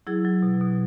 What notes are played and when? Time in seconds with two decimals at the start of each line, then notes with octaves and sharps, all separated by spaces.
0.07 F#3 E4 G#4
0.25 F#3
0.42 B2
0.61 B2